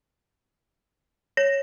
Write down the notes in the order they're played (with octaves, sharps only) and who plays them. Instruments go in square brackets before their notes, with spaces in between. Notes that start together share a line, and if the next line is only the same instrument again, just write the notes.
[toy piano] C#5 [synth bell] A#6